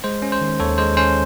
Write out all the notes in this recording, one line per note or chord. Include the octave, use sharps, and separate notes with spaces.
G#3 C5
C#4
C5
D#3
D#2 A4 C#5
G#3 C5
C#4 C5